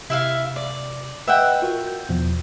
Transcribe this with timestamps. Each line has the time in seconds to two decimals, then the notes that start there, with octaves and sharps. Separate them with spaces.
0.10 C3 E4 E5 F5
0.56 D5
1.27 B4 D#5 E5 F#5 G5
1.62 F4 F#4 A#4
1.87 G6
2.09 E2 B2 F3